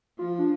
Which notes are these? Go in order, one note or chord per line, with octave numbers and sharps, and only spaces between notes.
F3 F4
D4